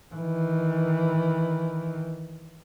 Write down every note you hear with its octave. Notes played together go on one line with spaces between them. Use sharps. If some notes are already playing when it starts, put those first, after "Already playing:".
D#3 E3